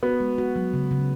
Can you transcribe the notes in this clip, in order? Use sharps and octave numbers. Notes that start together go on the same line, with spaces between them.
B3 F#4
G#3
F#4
F#3
C#3
C#3